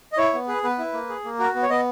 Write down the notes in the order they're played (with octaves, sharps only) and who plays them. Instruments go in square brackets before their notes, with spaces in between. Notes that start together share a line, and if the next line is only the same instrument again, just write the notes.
[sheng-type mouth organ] D#5
E4 C#5
B3
G#4 B4
B3 B4
E4
A#3
G#4
A#3
F#4 A#4
B3
C#5
B3 D#5